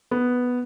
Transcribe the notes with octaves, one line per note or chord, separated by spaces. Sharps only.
B3